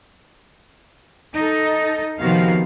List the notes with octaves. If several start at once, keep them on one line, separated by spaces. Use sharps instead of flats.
D#4 A4
C3 D#3 F3 B3 F#4 F5